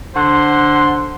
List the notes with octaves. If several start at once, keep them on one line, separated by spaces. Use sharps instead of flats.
D3 C5 F#5 C6